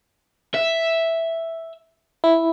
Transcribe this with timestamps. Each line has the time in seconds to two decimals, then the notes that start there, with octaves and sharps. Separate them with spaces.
0.55 E5
2.24 E4